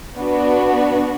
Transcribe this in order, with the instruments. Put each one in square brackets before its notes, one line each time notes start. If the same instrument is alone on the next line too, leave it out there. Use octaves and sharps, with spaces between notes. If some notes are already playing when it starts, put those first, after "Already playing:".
[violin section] B3 D4 F#4